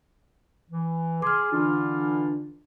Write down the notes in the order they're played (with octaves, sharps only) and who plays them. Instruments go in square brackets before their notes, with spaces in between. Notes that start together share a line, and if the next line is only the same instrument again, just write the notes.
[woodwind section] E3
[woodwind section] G#4 [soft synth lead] C6 [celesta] D6 F6
[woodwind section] D3 E3 F4 [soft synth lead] D4